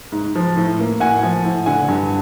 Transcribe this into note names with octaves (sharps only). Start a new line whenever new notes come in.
G#2
F3
A2
A#3
A2 F#5 G#5
F3
A2
D3 F#5 G#5
G2